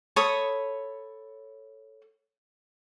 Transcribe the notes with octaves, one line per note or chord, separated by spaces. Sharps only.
A4 C#5 B5 D#6